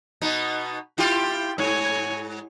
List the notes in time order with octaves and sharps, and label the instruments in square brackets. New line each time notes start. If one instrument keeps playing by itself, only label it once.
[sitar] B2 B3 D#4
[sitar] E4 F4 G4 [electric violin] G5
[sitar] G#2 [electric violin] C#5 G#5